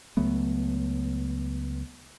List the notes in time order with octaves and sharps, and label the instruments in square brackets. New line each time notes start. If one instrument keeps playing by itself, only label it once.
[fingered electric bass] C#2 F#3 A3 B3